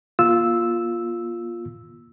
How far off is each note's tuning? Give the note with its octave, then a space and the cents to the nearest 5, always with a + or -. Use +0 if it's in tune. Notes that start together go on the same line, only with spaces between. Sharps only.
A#3 +35 F4 +0 E6 -5